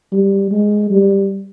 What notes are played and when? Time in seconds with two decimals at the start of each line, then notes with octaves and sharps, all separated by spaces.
0.13 G3
0.52 G#3
0.90 G3